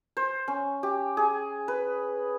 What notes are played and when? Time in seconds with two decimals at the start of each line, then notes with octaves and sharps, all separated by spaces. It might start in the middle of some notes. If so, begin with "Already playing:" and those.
0.17 C5
0.48 C#4
0.83 G4
1.17 G#4
1.68 B4